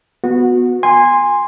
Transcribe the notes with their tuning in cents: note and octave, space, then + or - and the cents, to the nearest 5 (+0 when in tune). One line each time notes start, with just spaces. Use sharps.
B3 +0 F#4 -20
G#5 -25 C6 +0